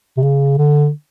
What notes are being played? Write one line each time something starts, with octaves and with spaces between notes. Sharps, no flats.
C3
C#3
D3